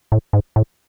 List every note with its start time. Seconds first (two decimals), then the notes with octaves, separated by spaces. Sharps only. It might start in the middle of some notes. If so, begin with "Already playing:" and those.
0.12 A2
0.33 G#2
0.56 A2